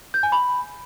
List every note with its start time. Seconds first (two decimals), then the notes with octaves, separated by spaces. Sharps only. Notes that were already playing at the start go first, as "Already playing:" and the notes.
0.14 G6
0.23 G#5
0.32 B5